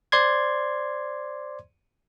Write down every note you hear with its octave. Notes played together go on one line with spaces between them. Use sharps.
C5 D5 C6 G#6